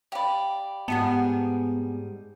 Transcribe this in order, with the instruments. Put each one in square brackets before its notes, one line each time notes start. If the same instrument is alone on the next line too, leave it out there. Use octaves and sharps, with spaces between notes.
[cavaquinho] G4 D5 [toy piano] F5 G5 B5
[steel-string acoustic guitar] G#2 G3 G#4 [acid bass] B3 [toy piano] F#5 A5